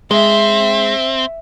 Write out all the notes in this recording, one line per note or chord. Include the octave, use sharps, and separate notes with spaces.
G#3 C4 E5